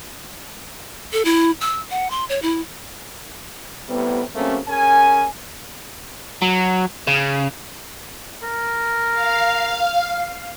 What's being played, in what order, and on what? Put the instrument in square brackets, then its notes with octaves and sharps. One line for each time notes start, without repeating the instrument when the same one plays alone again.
[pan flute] A4
E4
E6
F#5
C6
C#5
E4
[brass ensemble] A2 C3 G3 B3
C#3 F#3 A3 A#3 C4 C#4
C#4 G#4 A#4 G#5
[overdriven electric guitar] F#3
C#3
[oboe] A#4
[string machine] F5